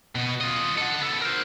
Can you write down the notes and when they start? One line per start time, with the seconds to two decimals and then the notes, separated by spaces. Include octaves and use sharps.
0.15 B2 B3
0.41 F4 D#5
0.78 A4 F#5
1.00 B3 A4
1.22 A#4 C5